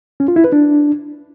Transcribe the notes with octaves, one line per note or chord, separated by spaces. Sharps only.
C#4
F4
E4
B4
D4